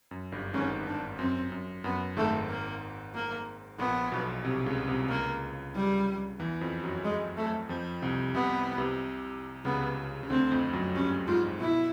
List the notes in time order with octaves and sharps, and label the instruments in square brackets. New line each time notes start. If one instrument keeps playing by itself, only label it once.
[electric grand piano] F#2
G1 G2
[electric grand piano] G#1 G#2 [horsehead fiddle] C#4
[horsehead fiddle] D4
[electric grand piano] F#2 [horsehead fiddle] C4
[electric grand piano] F#2
[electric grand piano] F#2 [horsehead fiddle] B3
[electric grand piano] G#1 G#2 [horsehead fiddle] A3
[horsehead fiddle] A#3
A#3
[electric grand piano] A#1 A#2 [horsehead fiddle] B3
[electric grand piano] B1 B2
C2 C3
C#2 C#3
C2 C3
[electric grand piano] C#2 C#3 [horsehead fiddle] A#3
[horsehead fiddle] G3
[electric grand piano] E2 E3
F2 F3
F#2 F#3
[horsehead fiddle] G#3
A3
[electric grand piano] F2 F3
C2 C3
[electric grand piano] C2 C3 [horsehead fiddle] B3
[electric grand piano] C2 C3
[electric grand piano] C#2 C#3 [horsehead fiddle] B3
[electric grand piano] C#3
[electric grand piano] D2 D3 [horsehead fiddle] C4
[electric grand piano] F2 F3
F#2 F#3
[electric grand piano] G2 G3 [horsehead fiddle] C#4
[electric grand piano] G#2 G#3 [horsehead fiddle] F4
[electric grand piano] B2 B3 [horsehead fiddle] E4